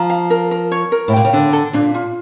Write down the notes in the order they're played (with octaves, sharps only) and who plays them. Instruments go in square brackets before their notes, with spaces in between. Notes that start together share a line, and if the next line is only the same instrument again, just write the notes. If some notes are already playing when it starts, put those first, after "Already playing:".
Already playing: [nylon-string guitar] F3 [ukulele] A#5
[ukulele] F5
A#4
A#4
C#5
A#4
[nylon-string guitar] A2
[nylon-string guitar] A#2 [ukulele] G5
[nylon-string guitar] C#3
[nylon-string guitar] D3 [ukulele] D4
[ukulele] A4
[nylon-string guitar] A#2 [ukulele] D4
[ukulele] F4